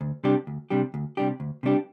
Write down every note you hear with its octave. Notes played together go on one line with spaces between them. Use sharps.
D2
C3 G3 D4 G4
D2
C3 G3 D4 G4
D2
C3 G3 D4 G4
D2
C3 G3 D4 G4